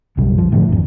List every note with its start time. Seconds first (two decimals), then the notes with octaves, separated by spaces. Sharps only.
0.17 B1 F#2 C#3 G3
0.38 F3
0.52 A2 D3
0.69 G#1 F2